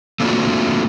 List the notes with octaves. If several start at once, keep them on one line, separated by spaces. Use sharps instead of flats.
A3 A#3 C4 D4 F4 F#4